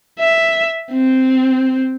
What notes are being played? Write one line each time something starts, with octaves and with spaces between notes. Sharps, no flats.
E5
C4